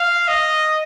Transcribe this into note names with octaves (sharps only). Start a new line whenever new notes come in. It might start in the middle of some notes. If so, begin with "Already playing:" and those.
Already playing: F5
D#5